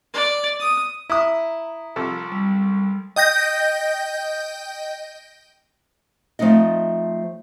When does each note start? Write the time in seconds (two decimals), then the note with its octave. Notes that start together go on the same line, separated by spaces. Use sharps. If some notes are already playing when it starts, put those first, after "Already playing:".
0.13 D5
0.60 D#6
1.10 E4 A#5 D#6
1.96 C2 F3 A4
2.32 G3
3.16 D#5 G5 G6 A#6
6.39 F3 A3 C4 D#4 D#5